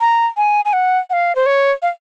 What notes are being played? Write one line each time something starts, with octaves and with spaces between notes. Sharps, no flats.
A#5
G#5
G#5
F#5
F#5
F5
C5
C#5
F5